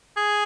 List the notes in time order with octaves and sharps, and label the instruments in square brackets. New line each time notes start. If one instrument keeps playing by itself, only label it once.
[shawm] G#4